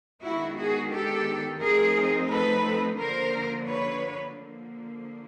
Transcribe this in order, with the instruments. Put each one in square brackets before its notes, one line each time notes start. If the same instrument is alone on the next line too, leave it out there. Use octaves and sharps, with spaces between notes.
[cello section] D#3 G#3 B3 D4 E4 F#4
F#4 G#4
G4 A4
F3 A3 C4 D#4 G#4 A#4
A4 B4
D3 F3 A#3 D4 A#4 C5
B4 C#5
D3 F3 A#3